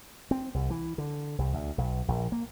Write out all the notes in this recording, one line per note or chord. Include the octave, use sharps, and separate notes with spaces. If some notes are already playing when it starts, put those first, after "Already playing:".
C4
C2
E3
D3
C2
D2
B1
A#1
A#3